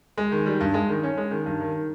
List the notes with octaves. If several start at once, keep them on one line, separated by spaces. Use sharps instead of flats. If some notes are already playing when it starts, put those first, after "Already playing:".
G#3
D#3
G3
G2
G#3
D#3
C#4
G#3
D#3
G2
D#3